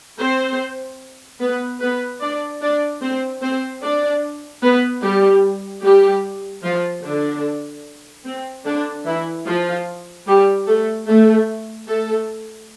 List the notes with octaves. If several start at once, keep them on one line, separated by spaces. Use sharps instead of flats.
C4 C5
B3 B4
B3 B4
D4 D5
D4 D5
C4 C5
C4 C5
D4 D5
B3 B4
G3 G4
G3 G4
F3 F4
D3 D4
C4
D3 D4
E3 E4
F3 F4
G3 G4
A3 A4
A3 A4
A3 A4